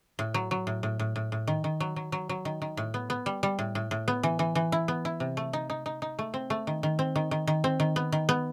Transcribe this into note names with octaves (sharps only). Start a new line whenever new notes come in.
A2
F#3
F#3
A2
A2
A2
A2
A2
D#3
D#3
F#3
F#3
F#3
F#3
D#3
D#3
A2
B3
B3
G3
G3
A2
A2
A2
B3
E3
E3
E3
E4
B3
E4
C3
A3
D#4
D#4
D#4
D#4
A3
C4
A3
D#3
D#3
C4
D#3
D#3
D#3
C4
D#3
B3
D#3
B3